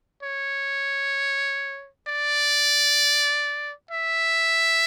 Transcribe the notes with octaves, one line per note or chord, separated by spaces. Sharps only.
C#5
D5
E5